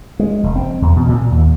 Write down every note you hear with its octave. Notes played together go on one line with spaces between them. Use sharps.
G#3
F1
C4
E2
B2
A#2
D#2